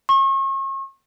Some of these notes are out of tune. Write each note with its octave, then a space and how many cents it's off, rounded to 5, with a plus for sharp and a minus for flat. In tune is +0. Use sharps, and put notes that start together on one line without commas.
C#6 -40